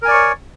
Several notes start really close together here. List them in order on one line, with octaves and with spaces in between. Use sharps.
A#4 G#5 D5 C#6 C#5